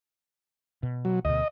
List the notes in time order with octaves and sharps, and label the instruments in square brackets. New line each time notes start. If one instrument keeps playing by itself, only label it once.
[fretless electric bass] B2
[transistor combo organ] F#3
[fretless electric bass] D2 B2 [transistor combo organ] D#5